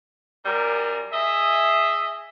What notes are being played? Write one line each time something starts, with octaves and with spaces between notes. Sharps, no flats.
F#2 G3 A#4
G#4 D#5 E5